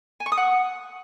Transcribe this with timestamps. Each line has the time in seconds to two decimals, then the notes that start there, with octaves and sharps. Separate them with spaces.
0.20 G#5
0.26 C#6
0.32 D#6
0.37 F#5